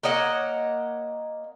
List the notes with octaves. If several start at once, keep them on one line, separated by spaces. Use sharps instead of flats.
A#3 C#5 D#5 F#5